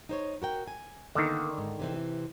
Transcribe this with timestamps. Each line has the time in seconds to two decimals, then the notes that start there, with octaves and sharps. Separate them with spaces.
0.09 D#4 C5 C#5
0.42 F#4 A#4 G5
0.68 G#5
1.15 D3 D#3 A#3 B3 D4
1.58 G#2
1.80 C3 E3 C4